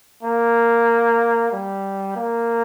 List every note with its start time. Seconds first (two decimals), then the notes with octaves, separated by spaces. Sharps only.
0.23 A#3
1.52 G3
2.16 A#3